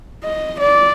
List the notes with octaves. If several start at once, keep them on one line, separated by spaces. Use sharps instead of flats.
D#5
D5